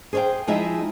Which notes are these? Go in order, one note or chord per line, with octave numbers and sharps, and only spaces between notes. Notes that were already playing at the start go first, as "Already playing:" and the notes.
G#4 C5 C#5 F5 G5
F3 G#3 D#4 E4 G#4 E5